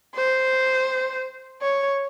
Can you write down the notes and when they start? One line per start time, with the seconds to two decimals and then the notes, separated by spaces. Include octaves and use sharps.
0.15 C5
1.62 C#5